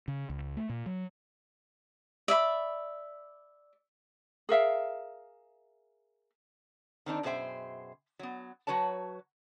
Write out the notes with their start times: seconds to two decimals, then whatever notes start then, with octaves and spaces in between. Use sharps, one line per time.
0.08 C#3
0.30 C#2
0.57 A3
0.69 A#2
0.86 F#3
2.28 D5 E5 B5
4.49 G#4 A#4 E5 F5
7.06 D#3 C4 D4 D#4
7.23 F#2 B2 G#4 C5 E5 G5
8.19 F#3 B3
8.67 F#3 F#4 B4 C#5 A5